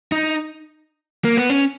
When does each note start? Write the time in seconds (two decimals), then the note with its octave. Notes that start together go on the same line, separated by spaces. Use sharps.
0.12 D#4
1.24 A#3
1.37 B3
1.50 C#4